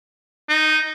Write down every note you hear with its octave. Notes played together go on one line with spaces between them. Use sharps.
D#4